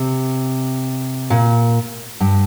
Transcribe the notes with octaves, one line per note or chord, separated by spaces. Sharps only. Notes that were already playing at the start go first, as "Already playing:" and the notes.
Already playing: C3
A#2
G2